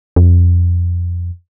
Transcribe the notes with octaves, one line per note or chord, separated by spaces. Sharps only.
F2